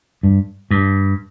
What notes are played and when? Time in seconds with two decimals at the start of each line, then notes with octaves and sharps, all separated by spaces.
0.23 G2
0.71 G2